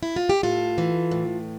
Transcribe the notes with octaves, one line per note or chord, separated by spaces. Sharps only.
E4
F4
G4
A2 F4 A4
E3
A2